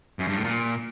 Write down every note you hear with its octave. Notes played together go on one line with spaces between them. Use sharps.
F#2
G2
A2
A#2